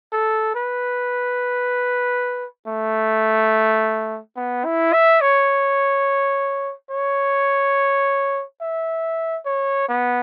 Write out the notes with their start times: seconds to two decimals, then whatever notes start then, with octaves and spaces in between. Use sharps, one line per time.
0.12 A4
0.55 B4
2.67 A3
4.37 B3
4.65 E4
4.93 E5
5.21 C#5
6.91 C#5
8.61 E5
9.46 C#5
9.88 B3